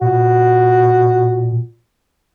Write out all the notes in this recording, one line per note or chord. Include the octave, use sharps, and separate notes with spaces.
A#2 F#4